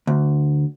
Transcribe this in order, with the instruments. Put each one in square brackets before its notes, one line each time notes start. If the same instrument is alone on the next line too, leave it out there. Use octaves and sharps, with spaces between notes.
[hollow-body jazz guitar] D2